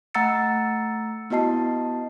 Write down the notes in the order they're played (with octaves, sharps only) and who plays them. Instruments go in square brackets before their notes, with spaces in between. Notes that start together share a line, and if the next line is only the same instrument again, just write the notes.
[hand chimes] A3 F#5 A#5 E6 A6 C#7
B3 E4 F#4 D#5 A5 C7